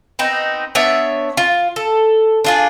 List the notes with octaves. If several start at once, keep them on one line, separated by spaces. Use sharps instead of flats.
B3 C4 D#4
B3 D4 C#5 E5
F4
A4
D4 F4 G#4